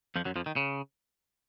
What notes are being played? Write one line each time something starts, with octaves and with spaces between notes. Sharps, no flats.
F2 F3
F#2 F#3
F2 F3
D#3
C#3